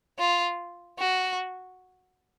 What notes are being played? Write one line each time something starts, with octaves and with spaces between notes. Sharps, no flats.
F4
F#4